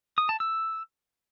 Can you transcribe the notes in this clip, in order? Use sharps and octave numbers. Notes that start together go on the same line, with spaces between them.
D#6
A5
E6